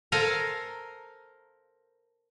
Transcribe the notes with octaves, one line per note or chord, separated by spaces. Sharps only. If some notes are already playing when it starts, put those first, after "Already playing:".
A4 A#4 C5 F5 G#5 A#5